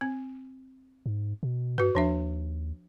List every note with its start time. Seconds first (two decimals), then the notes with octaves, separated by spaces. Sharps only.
0.01 C4
1.06 G#2
1.43 B2
1.78 G2 F#4 B4
1.95 D#2 F3 D4 E5